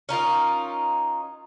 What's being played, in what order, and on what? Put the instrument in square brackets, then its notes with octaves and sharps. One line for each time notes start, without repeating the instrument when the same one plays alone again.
[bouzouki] C#4 D#4 F4 A#4